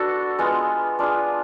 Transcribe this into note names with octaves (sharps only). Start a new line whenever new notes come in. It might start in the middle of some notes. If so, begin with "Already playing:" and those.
Already playing: B3 D4 F#4 A4
G#3 B3 F4
D4 F4 G#4